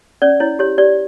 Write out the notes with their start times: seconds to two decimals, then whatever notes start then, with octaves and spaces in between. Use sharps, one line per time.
0.22 C#4 D5
0.40 E4 C#5
0.59 G4 C#5
0.78 G4 D5